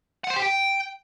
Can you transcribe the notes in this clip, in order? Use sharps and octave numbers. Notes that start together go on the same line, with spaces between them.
F#5
C5
G4
G5